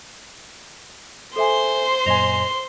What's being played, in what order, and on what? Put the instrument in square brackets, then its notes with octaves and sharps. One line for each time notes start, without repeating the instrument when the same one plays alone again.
[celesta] A4 E5 G#5 [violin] C5 [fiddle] C6
[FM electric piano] F#2 A#2 G#5 [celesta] D#5 A#6 F7